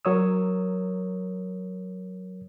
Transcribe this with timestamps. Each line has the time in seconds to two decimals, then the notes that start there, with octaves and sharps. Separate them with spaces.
0.05 F#3 A#4 C#5 D#6 E6